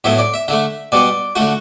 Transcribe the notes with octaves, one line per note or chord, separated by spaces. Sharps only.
A2 F#3 B3 E5
D5
E5
D3 A3 E5
B2 G3 B3 D5
D3 A3 F#4